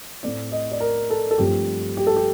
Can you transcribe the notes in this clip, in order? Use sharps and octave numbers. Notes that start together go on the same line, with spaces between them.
A2 A3 C4 D5
D#5
D5
A#4
A4
A4
G2 F3 A3 C4 G4
G4
A4
G4